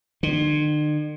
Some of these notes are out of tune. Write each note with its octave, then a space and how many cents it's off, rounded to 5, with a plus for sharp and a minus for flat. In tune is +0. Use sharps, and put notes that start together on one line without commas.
D3 +45